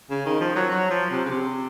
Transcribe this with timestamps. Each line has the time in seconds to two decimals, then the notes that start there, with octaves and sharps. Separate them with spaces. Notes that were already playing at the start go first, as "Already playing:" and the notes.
0.10 C#3
0.25 D#3
0.40 F3
0.55 F#3
0.70 F#3
0.90 F3
1.11 C3
1.25 C#3
1.31 C3